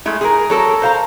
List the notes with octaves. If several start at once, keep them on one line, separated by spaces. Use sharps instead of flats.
G#3 A3 E4
G#4 A#4
F#3 A4 A#4
C5 F5 A#5